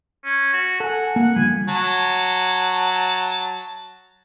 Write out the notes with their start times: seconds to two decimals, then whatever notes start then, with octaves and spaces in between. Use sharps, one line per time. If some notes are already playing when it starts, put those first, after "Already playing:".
0.25 C#4
0.53 F#4
0.80 A4 F#5 G#5
1.16 A#3
1.36 D3 F3 G3 G#5
1.69 F#3 A5